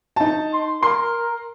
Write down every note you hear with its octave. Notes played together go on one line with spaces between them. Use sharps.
D#4 A5
C6
A#4 C6